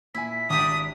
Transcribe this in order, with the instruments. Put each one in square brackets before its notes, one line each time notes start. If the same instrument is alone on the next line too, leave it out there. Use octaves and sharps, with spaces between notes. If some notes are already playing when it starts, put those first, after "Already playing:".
[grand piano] A#2 G#5 [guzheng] E4 [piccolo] B6
[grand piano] G#1 [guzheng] D4 G4 D5 [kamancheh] D#6